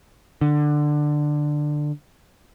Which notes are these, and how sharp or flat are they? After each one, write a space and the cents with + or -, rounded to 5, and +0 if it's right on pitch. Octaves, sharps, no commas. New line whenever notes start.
D3 +15